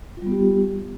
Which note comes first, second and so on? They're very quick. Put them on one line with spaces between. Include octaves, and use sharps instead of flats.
F4 G3 B3 G4